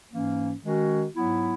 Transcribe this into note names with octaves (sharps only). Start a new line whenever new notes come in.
G#2 E3 A#3 C#4
D#3 G#3 C#4 F#4
G#2 F#3 B3 E4